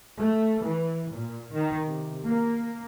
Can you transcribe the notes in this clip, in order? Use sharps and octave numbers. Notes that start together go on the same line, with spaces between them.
A3
E3
A#2
D#3
C3
A#3